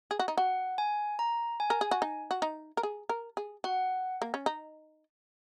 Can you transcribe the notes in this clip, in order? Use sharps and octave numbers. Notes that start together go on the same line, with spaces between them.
G#4
F#4
D#4
F#4 F#5
G#5
A#5
G#5
A#4
G#4
F#4
D#4
F#4
D#4
A#4
G#4
A#4
G#4
F#4 F#5
A#3
C#4
D#4